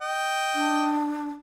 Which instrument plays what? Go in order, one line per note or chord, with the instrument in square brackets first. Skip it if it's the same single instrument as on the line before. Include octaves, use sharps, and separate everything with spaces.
[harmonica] D#5 G5
[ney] D4